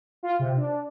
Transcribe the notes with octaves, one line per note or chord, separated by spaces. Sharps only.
F4
C3
D4